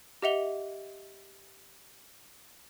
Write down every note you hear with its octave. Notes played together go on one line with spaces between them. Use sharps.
G4 D#5 E5 F#5 F7 G7